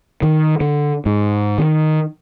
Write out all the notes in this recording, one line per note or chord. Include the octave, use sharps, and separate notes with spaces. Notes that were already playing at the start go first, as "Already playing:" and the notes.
D#3
D3
G#2
D#3